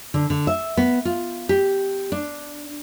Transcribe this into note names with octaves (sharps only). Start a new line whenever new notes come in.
D3
D3
E5
B3
F4
G4
D4